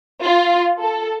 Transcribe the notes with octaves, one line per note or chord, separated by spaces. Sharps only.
F4
A4